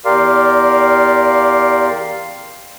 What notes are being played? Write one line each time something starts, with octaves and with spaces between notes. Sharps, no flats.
E2 G4 A#4 D5 F5 C6